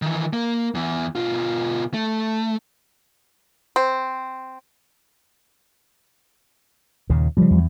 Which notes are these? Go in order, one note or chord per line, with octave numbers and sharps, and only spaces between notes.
D#3 E3
A#3
E2 E3
B2 F4
A3
C4
D#2 A#2 C#3
G2 C#3 F3 G3
E2